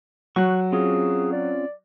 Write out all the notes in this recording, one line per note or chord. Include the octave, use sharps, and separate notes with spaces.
F#3 C#6 F#6
C4 C#4 F4 G#4
D5